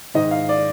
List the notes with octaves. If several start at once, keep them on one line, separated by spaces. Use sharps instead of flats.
G#2 D#3 D#5
F5
D5